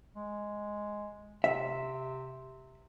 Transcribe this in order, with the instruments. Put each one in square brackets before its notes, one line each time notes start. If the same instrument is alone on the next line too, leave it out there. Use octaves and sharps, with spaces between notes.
[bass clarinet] G#3
[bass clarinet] C3 [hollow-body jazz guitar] E5